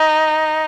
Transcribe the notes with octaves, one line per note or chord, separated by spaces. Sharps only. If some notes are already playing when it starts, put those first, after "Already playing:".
Already playing: D#4